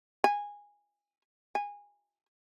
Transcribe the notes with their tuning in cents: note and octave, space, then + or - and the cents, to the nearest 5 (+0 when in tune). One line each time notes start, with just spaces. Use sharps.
G#5 -15
G#5 -20